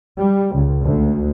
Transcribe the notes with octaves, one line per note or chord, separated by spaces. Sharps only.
G3
C#2
D2